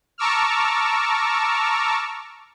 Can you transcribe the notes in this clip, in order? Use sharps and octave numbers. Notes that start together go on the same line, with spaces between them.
A5 A#5 C#6 D6 E6 F6